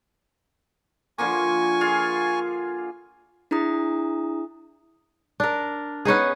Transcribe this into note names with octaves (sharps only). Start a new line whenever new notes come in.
D3 F3 A#3 G#5 C#6
F4 G#4 F5
D4 E4 G#4 A#5 D#6
D4 A#4
B3 C#4 D#4 G#4